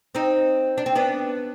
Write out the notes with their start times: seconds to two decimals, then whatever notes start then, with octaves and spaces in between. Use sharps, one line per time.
0.15 C4 D#4
0.78 D4
0.86 C4
0.95 B3 D4